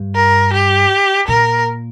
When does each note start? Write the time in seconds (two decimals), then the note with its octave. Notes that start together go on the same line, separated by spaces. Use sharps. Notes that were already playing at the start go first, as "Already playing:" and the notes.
Already playing: G2
0.15 A#4
0.53 G4
1.28 A#2 A#4